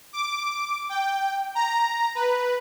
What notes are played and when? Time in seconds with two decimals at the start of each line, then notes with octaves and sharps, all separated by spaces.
0.13 D6
0.89 G5
1.55 A#5
2.15 B4